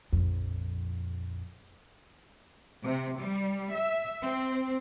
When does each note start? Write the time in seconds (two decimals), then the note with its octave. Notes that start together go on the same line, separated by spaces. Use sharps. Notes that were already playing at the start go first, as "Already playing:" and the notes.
0.12 A#1 F2
2.84 C3
3.19 G3
3.73 E5
4.23 C4